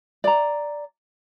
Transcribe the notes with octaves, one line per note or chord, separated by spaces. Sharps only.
D5 A#5